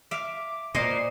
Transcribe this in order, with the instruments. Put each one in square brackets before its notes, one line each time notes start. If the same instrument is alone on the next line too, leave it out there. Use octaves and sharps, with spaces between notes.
[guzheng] E5 F5 [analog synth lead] D6
[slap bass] A#2 [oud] B4 C5 D5 [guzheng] D#5 [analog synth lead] C7